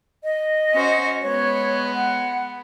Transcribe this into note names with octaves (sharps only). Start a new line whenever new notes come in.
D#5
C#4 F#4 C5
G#3 B3 C#5
F#5